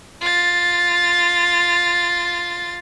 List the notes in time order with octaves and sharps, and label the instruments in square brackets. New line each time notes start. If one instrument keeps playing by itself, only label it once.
[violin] F4 A6